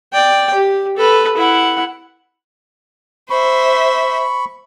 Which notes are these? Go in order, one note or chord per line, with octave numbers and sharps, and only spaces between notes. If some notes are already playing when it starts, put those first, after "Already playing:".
D5 G5
G4
A4 B4
E4 F#5
C5 E5 B5 C#6